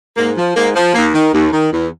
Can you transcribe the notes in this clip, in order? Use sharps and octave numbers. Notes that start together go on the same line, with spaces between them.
G#2 A#3
F3
G#2 A#3
F3
D#2 A#3
D#3
D#2
D#3
E2